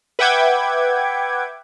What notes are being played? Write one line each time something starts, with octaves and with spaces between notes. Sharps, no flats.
B4 E5 F#5 G5 D6 G#6